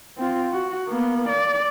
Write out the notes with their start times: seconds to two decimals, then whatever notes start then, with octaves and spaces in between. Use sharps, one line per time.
0.18 C4 F4
0.52 F#4
0.89 A#3 B3
1.29 D5